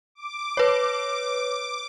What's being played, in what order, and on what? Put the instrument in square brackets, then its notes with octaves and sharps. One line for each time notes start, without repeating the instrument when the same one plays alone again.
[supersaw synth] D6
[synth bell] B4 C#5